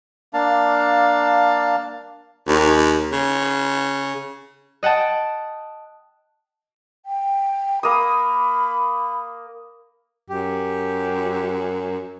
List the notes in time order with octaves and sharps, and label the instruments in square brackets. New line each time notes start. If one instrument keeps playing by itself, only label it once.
[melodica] A#3 D4 F5 A5
[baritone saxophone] D#2
C#3
[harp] D#5 F#5 G5 A5
[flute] G5
[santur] A#3 D#6 [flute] B5
[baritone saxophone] F#2 [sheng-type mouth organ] G4